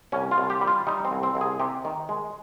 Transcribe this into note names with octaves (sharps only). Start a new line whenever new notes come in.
C2 C#4
F4
C2
G4
G3
F4
G3 D#4
C4
C2
C4
C2
G#4
C3 G4
D#3
G#3